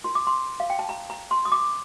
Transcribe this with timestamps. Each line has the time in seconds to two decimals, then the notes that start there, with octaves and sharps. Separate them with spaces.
0.04 F4 A#4 C6
0.15 D6
0.27 C6
0.60 F5
0.70 G5
0.79 A5
0.89 A#5
1.10 A#5
1.31 C6
1.45 D#6
1.52 D6